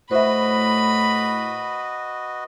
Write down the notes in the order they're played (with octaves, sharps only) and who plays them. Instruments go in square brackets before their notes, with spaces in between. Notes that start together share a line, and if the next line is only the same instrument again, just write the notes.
[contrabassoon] A2 [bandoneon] F#4 B4 D#5 [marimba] C5 E5 [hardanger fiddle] B5